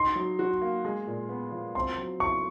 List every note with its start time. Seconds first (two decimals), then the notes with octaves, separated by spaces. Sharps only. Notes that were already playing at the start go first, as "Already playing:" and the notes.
Already playing: D#4 C6
0.16 F#3
0.39 F#4
0.62 A#3
0.85 G#3
1.07 A#2
1.29 B3
1.52 F3
1.75 C4 C6
1.98 F#3
2.20 E4 C#6